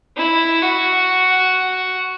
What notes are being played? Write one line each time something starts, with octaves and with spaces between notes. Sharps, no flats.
E4
F#4